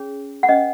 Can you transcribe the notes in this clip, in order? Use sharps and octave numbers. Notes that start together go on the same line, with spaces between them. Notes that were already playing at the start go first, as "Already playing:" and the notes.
Already playing: C#4 G#4 C#5
F#5
C#4 B4 D#5